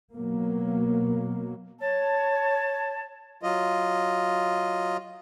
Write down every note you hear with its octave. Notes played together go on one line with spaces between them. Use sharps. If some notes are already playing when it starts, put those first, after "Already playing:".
B2 F#3 A#3
C#5 A5
F#3 F4 D#5